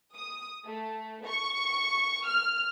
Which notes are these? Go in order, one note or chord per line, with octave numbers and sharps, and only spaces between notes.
D#6
A3
C#6
F6